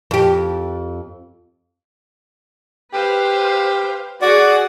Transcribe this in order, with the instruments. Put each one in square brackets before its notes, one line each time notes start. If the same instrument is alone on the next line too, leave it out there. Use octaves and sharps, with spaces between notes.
[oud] F2 G4
[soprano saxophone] G4 [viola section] B4 C5 F5
[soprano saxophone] F#4 [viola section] G#4 F#5 [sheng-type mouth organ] D5